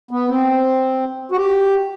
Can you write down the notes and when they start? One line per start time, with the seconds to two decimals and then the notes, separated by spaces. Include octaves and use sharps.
0.11 B3
0.29 C4
1.31 F#4
1.37 G4